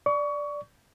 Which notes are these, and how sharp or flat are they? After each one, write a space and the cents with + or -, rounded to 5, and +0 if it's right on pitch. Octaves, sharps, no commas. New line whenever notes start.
D5 +0 C#6 +25